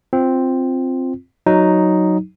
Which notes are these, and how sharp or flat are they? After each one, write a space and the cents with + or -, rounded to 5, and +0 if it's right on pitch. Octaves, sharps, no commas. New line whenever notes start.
C4 +0 F4 +0
F#3 +0 D#4 +0